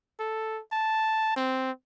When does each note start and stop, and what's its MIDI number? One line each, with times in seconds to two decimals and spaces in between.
0.19 0.60 69
0.72 1.34 81
1.36 1.71 60